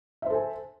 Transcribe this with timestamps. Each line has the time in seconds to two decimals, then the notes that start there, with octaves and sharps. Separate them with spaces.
0.22 E5
0.26 C5
0.30 A4
0.34 G#5